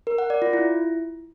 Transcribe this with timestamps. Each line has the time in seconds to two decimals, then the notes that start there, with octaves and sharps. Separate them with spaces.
0.07 A#4
0.18 F#5
0.30 D5
0.42 F4
0.53 E4